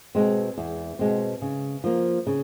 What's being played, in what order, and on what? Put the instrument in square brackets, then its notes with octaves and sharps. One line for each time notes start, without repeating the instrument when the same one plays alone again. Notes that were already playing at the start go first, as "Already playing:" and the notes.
[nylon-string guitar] B2 G#3 C4
E2
B2 G#3 C4
C#3
F3 A#3
C#3